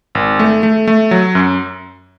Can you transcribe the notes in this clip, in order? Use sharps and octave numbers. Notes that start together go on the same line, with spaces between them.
G#1
A3
A3
A3
F#3
F#2